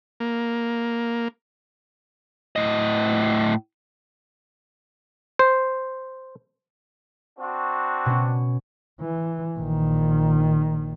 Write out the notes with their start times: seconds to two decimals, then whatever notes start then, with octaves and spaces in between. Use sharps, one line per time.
0.20 A#3
2.56 A2 D#5
5.39 C5
7.38 C4 D4 F#4
8.06 B2 C#4
9.01 E3
9.58 A#1 D#3